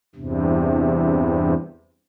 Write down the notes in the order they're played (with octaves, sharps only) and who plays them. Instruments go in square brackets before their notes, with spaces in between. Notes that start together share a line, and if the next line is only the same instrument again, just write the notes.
[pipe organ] E2 G2 C3